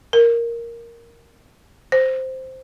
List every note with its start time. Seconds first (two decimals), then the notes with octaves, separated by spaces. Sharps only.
0.13 A#4
1.92 C5